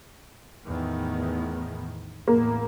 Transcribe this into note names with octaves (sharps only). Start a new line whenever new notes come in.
E2 A2 D#3
A1 E2 A2 A#3